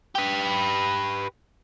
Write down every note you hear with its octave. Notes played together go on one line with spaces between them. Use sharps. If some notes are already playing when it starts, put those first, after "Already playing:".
G4 B4